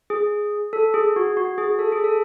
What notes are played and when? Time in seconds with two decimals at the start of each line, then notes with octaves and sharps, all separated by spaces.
0.10 G#4
0.73 A4
0.94 G#4
1.16 F#4
1.37 F#4
1.58 G#4
1.79 A4
1.92 G#4
2.04 A4